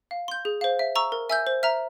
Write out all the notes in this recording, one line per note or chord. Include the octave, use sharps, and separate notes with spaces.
F5
C6 G6
G#4
C5 F5
E5
A#5 C#6 E6
A#4
E5 G#5 E6 G6
C5
E5 A#5 F6